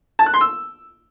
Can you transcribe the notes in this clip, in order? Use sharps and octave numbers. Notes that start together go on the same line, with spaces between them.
A5
F#6
C6
E6